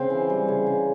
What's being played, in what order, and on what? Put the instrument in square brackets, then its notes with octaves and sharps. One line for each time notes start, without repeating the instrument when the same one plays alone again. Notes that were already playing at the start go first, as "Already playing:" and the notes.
Already playing: [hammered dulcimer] C#3 C4
E3
G3
C#3
C#3